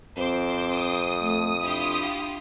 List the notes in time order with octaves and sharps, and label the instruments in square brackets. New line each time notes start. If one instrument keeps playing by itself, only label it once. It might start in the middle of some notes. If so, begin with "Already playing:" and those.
[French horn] F2 [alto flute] C4 [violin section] C5 D6
[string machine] D#6
[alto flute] A3
[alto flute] D4 [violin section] E4 F4 G4